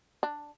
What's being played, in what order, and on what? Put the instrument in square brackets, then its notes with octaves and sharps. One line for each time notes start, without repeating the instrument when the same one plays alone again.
[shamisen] D4